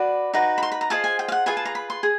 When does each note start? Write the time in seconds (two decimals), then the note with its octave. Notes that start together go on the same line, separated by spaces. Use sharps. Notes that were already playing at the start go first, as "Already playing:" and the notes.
Already playing: F#4 B4 D5
0.33 D#4 F#4 B4
0.58 B5
0.63 C6
0.72 B5
0.81 A#5
0.90 F4 G#4 C5 D#5 A5
1.04 G#5
1.19 G5
1.28 F5
1.32 F#5
1.46 F4 G#4 B4 G#5
1.57 A5
1.65 A#5
1.75 B5
1.90 C6
2.03 G#4